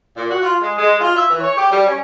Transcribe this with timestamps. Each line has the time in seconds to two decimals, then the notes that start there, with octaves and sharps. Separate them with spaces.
0.15 A#2
0.29 F#4
0.41 F4
0.60 G#3
0.78 G#3
1.00 F4
1.15 E5
1.29 E3
1.41 C#5
1.56 G4
1.70 G3
1.87 C#4